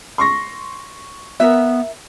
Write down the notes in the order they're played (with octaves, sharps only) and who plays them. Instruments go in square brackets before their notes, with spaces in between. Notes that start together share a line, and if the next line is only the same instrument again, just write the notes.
[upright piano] C6 C#6 A#6
[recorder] B3 [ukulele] A#4 E5